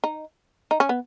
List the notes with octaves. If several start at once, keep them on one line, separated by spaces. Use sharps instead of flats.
D#4
D#4
C#4
B3